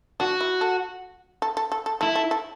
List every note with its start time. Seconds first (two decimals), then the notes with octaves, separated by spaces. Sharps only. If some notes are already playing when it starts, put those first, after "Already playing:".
0.20 D4 F#4
0.41 E4
0.61 A4
1.42 A4
1.57 A4
1.72 A4
1.86 A4
2.01 E4 A4
2.15 A4
2.31 A4